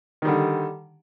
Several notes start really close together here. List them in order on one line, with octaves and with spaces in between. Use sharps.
D#3 G3 D3